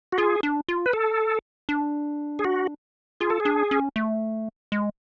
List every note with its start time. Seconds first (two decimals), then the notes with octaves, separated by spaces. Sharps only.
0.12 F#4
0.18 F4 G#4
0.43 D4
0.69 F4
0.86 B4
0.93 A4
1.69 D4
2.39 G#4
2.44 F#4
3.21 F4 G#4
3.30 A4
3.40 G#4
3.45 D4
3.71 C#4
3.96 A3
4.72 G#3